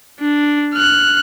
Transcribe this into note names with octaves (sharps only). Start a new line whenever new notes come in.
D4
F6 F#6